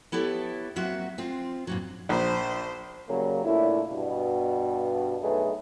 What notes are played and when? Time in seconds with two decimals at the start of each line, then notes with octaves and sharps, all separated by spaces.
0.12 B3 E4 G4 A4 C#5
0.76 F#3 A#3 C4 F#4 E5
1.18 C4 F4
1.67 G2 A#2 F#3
2.09 A#1 C5
3.08 C#3 F#3 G3 A#3
3.45 A#2 A3 D4 E4
3.91 G2 B2
5.21 B1 A3 D#4 G#4 B4